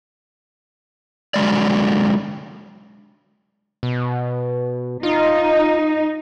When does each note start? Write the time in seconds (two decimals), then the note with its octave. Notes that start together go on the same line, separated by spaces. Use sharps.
1.34 D3 F#3 G#3 D5
3.83 B2
5.03 D#4 F4